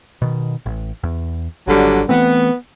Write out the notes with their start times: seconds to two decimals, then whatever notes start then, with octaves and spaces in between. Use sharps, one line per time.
0.22 B2 D#3
0.66 A1
1.03 E2
1.67 G#1 D3 F#3 G3
2.09 E3 A3 B3 C4